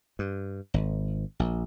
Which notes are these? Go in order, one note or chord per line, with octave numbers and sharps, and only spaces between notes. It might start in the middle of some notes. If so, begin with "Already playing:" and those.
G2
G#1
A#1